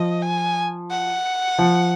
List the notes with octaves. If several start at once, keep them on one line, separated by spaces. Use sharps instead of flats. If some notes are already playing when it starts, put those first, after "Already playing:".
Already playing: F3 D#5
G#5
F#5
F3